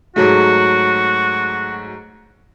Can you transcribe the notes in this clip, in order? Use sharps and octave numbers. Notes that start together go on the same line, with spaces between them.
G#2 F#3 A3 F#4